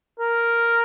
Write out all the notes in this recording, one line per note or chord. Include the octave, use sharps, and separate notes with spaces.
A#4